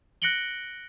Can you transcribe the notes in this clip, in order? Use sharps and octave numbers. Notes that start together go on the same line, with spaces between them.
F#6 A#6 C#7 D7 F#7 G7